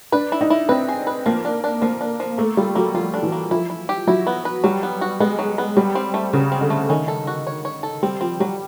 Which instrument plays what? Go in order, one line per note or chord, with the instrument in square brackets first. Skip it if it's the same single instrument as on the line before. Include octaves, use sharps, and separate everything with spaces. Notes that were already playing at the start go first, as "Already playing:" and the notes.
[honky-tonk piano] D4 [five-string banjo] B4
[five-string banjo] E4
[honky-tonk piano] D#4
[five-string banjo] E4
[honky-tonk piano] C4 [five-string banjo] B4
[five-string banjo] G#4
B4
[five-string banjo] F3 [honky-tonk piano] A#3
[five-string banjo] D4
D4
[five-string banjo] F3 [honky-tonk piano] A#3
[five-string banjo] D4
F3
[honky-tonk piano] A3 [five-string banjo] A#3
[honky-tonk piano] G3 [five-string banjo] F4
[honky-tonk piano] F#3 [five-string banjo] A#3
[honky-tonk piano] F3 [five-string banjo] F4
[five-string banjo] D4
[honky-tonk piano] E3
[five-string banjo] A#3
[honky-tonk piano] F3 [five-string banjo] E4
[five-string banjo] E4
G4
[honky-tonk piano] F#3 [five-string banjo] E4
[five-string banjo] B3
B4
[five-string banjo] F#3 [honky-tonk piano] G3
[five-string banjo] B3
F#4
[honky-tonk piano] G#3 [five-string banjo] B3
[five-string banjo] F#3
B3
[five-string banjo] F#3 [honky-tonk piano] G3
[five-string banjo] C4
A3
[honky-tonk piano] C#3 [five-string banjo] F#3
[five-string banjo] C4
[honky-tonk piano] D3
[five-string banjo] A3
[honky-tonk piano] D#3 [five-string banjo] C#4
[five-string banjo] A4
F#4
C#5
C#5
A4
[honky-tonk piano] G3 [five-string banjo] C4
[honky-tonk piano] F3 [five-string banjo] C4
[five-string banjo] F#3 [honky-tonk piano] G3